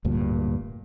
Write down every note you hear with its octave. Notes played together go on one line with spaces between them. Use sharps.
D1 D2 G2 A#2